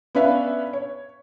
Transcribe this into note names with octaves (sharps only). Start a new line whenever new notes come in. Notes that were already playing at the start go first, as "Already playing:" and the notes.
B3 C#4 D4 B4 E5 F5
C#5